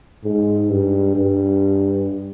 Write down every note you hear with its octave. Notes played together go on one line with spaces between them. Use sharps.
G#2
G2
G2